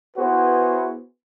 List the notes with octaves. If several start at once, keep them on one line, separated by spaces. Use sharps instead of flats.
B3 E4 F#4 G#4 B4 C5